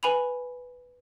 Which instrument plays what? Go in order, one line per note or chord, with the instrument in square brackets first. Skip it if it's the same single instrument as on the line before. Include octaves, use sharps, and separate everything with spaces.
[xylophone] B4 G#5 B5 F7